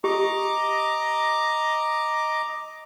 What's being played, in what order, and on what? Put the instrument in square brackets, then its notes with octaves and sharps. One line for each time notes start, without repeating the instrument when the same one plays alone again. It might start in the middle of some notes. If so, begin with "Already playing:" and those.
[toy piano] G4 [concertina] D#5 A#5 D6